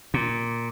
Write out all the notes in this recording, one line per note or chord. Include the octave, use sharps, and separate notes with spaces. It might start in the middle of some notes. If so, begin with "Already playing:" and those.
A#2